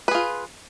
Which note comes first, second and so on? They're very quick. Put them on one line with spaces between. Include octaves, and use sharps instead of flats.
B4 G#4 F4